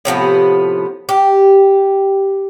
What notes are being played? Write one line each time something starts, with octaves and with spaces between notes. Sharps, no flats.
A2 C3 F3 B3
G4